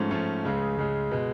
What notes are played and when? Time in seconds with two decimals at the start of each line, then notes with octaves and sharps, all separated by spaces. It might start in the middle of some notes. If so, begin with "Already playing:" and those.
Already playing: G#2 F3 A3 C#4
0.11 G#2 F3 A3 C#4
0.44 C#2 C#3 G#3
0.77 C#2 C#3 G#3
1.11 B2 G#3